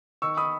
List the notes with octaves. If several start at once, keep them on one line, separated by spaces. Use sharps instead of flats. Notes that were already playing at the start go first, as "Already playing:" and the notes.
D#3 C#6 E6
D#3 B5 D#6